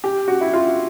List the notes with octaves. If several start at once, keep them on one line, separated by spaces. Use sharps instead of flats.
G4
F#4
E4
F4